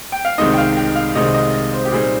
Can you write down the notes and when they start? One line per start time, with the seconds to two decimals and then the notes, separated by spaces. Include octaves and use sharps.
0.12 G5
0.25 F5
0.38 C2 C3 D#3 G#3 D#4 D#5
0.53 G5
0.58 F5
0.77 G5
0.95 F5
1.15 C2 C3 D#3 G#3 D#4 D#5
1.34 D#5
1.54 D#5
1.73 C5
1.85 G4
1.92 A#2 G3 C4 D#4 G#4